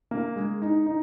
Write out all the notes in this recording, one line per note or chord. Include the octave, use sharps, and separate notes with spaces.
A#3
G#3
D#4
D#4